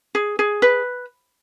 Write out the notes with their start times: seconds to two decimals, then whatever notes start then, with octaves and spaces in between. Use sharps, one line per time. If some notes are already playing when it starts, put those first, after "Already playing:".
0.15 G#4
0.39 G#4
0.62 B4